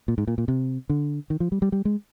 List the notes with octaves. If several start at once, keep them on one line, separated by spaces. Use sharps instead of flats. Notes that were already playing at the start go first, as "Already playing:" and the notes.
A#2
G#2
A#2
A#2
C3
D3
D#3
F3
G3
G3
G3
G#3